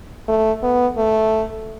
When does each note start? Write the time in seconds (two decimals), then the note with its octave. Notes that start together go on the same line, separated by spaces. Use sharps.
0.28 A3
0.63 B3
0.98 A3